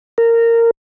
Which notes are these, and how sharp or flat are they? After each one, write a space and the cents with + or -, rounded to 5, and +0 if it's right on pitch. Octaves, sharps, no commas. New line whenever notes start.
A#4 -15